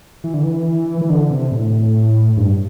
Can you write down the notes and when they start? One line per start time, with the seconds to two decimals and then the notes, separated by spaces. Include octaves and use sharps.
0.24 E3
0.34 D3
0.43 E3
1.01 E3
1.10 D3
1.30 C3
1.52 A2
2.37 G2